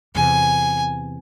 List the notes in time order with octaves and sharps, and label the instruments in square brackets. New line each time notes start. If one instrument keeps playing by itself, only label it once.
[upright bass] E2 C3 [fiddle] G#5